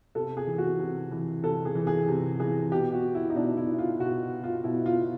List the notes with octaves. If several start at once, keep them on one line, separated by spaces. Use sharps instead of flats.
C3 A4
G#4
E3
F#4
C3
E3
C3 A4
G#4
E3
G#4
C3
E3 G#4
B2 G4
F#4
E4
D#4
B2 D4
E4
F4
B2 F#4
F4
B2 E4
F4